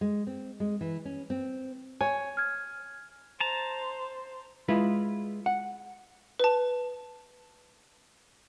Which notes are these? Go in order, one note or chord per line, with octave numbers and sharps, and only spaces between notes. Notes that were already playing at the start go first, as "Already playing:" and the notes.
G#3
C4
G#3
E3
C#4
C4
C#5 G#5
F6 G#6
C5 A5 A#5
G#3 E4 F4 B4
F#5
B4 A5